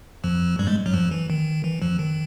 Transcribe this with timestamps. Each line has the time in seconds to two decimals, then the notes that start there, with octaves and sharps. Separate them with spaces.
0.24 F2 F3
0.59 G2 G3
0.67 G#2 G#3
0.86 F#2 F#3
0.93 F2 F3
1.11 E3
1.30 D#3
1.64 E3
1.82 F2 F3
1.99 D#3